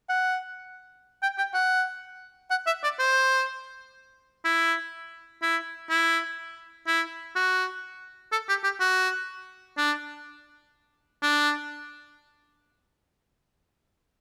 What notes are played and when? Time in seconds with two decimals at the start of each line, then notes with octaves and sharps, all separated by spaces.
0.09 F#5
1.23 G5
1.38 G5
1.54 F#5
2.51 F#5
2.67 E5
2.84 D5
2.99 C5
4.45 E4
5.42 E4
5.90 E4
6.87 E4
7.36 F#4
8.32 A4
8.49 G4
8.64 G4
8.80 F#4
9.77 D4
11.22 D4